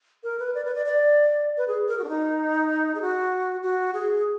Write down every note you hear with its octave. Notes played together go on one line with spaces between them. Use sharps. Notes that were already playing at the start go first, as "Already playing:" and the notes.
A#4
B4
D5
B4
D5
D5
B4
G#4
A#4
F#4
D4
D#4
G#4
F#4
F#4
G#4